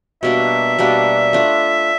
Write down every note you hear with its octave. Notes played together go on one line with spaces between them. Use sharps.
B2 G3 A#3 D4 E5
B2 G3 A#3 D4
A3 D4 F4